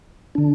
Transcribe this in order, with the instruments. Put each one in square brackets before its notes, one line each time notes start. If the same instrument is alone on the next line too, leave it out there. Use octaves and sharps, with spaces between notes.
[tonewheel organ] D3 D4